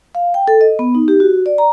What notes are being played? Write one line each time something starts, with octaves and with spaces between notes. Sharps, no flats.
F5
G5
A4
D#5
B3
D#4
G4
F#4
D5
A#5